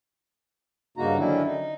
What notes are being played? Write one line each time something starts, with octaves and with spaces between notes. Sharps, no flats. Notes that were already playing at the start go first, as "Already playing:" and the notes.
G2 C#3 A#3 D#4 F#4 A#5
D3 D#3 F#3 C#4 D4 E4
D#4